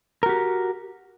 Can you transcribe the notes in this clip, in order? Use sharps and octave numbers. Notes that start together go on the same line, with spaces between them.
F#4 G4 A#4